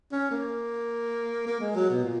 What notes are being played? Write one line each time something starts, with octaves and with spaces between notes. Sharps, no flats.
C#4
A#3
A#3
G#3
F#3
B2
A#2